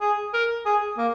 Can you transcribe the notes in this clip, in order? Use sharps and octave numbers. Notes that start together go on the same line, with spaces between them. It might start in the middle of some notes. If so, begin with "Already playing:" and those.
G#4
A#4
G#4
A#3